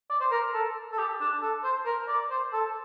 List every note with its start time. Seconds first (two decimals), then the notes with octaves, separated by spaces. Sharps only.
0.10 D5
0.21 C5
0.31 A#4
0.54 A4
0.92 A4
0.98 G4
1.20 D4
1.42 A4
1.64 C5
1.86 A#4
2.09 D5
2.30 C5
2.53 A4